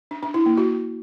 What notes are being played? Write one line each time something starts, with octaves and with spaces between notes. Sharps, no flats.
D4
D4
E4
A#3
F#4